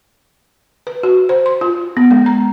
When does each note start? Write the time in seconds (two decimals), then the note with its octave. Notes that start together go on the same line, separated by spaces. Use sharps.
0.87 B4
1.03 F#4
1.29 C5
1.46 C6
1.61 F4
1.97 B3
2.11 G#3
2.26 A#5